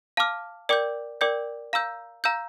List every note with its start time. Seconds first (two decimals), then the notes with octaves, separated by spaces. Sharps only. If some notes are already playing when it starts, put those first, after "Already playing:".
0.17 F5 A5 D6 F6
0.69 A#4 D5 G5 D6 G6
1.21 A#4 D5 G5 D6 G6
1.73 F5 A#5 E6 G6
2.24 F5 A#5 E6 G6